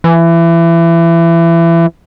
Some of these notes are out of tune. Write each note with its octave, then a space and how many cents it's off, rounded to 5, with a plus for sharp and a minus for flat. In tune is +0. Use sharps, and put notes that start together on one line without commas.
E3 +25